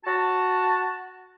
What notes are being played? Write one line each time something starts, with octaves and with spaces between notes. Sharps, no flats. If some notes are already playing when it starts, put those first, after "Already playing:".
F#4 A5